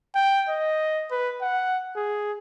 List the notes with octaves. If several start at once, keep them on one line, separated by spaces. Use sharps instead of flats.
G5
D#5
B4
F#5
G#4